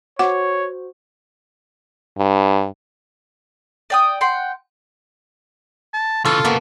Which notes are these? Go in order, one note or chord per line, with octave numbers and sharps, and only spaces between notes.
F#4 C5 C#5 F#5 D6
G2
D5 G5 D#6
F#5 G5 C6
A5
C#3 E3 F4 A4
C#3 A#3 B3